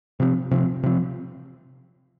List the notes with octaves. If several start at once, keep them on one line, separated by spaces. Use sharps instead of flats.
C3 F3 C4
C3 F3 C4
C3 F3 C4